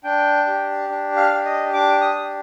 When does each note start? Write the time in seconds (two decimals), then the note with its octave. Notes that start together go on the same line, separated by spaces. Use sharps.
0.04 D4 G5
0.46 G4
0.89 D4
1.16 F5
1.31 G4
1.45 D#5
1.73 D4 D6
2.01 D#6
2.15 G4